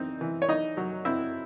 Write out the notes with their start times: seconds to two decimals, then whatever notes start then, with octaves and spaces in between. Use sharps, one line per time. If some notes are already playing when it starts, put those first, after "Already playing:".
Already playing: E3 C4 D#4
0.21 E3
0.42 C#5
0.49 D#4 D#5
0.77 F#3
1.05 C4 E4 E5